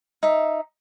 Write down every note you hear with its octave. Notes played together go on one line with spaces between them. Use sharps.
D#4 E5